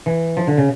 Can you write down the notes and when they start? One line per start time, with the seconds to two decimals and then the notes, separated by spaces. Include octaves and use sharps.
0.06 E3
0.37 F3
0.47 D3
0.57 C#3